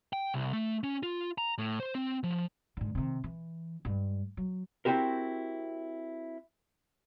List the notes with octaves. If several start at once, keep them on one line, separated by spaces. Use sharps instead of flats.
G5
C2
A3
C#4
F4
A#5
A2
C5
C4
F3
G#2 D3
C3 D#3
E3
G2 G#3
F#3
C4 E4 F#4 G4 A#4